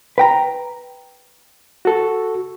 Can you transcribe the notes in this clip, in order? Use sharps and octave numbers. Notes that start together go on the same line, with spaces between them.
B4 G5 A#5
F#4 A4